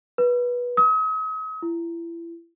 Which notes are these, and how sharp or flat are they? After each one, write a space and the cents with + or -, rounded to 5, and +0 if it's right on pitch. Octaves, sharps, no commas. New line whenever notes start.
B4 -20
D#6 +40
E4 +35